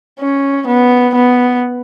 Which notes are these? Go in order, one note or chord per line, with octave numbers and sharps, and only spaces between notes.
C#4
B3
B3